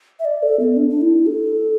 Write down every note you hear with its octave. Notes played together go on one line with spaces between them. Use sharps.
E5
D5
A4
B3
D4
D4
E4
A4